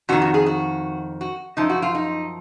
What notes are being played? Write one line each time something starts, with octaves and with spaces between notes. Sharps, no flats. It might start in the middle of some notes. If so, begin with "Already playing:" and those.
F2 D#3 F#4
F#4
G#4
F#4
F#4
F#2 F3 D#4
F#4
F4
D#4